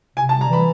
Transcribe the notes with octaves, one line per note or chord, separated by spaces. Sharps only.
C3 G#5
A5
G3
A#5
E3 B5